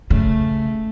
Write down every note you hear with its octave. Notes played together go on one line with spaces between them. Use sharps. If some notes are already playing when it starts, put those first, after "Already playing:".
C#3 A3